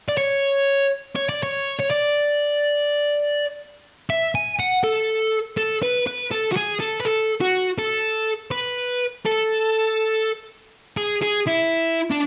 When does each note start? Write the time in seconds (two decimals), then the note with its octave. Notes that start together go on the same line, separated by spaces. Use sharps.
0.09 D5
0.17 C#5
1.16 C#5
1.29 D5
1.43 C#5
1.79 C#5
1.90 D5
4.10 E5
4.35 G#5
4.59 F#5
4.84 A4
5.57 A4
5.83 B4
6.07 B4
6.31 A4
6.52 F#4
6.56 G#4
6.80 A4
7.00 B4
7.05 A4
7.41 F#4
7.79 A4
8.51 B4
9.26 A4
10.97 G#4
11.22 G#4
11.47 E4
12.11 D4